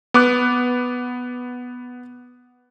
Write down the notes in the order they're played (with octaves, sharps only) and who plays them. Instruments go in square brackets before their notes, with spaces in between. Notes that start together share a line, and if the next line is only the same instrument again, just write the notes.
[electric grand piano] B3 D6 F#6